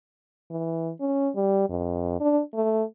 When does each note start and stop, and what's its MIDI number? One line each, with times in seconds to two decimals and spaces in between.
0.50 0.92 52
1.00 1.29 61
1.35 1.66 55
1.70 2.20 41
2.20 2.41 62
2.54 2.83 57